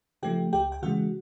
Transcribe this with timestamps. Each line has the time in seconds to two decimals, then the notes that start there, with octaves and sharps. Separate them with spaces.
0.22 C#3 F3 A3 G4 G5
0.53 C#2 G4 G5
0.72 G5
0.82 C#3 E3 G#3 F#4 F#5